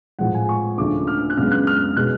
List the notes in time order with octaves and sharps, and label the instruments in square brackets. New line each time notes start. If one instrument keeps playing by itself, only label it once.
[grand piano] A2 F3 G#3 F#5
G#5
C#6
D2 C#3 F3 A3 D4 D6
F6
F#6
F#2 C#3 G#3 B3 F6
F#6
F6
B2 G#3 C#4 F#6